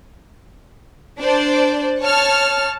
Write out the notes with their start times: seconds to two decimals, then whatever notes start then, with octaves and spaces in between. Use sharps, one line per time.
1.19 D4 C5 D5
2.02 C#5 A5 F6